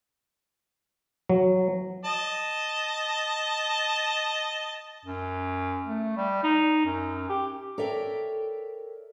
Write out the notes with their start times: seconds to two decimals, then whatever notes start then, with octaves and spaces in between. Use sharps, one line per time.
1.29 F#3
2.05 D#5 A5
5.05 F#2
5.87 A3
6.17 G3
6.43 D#4
6.85 F#2
7.29 G4
7.78 A4 A#4 C#5 D5 E5 G5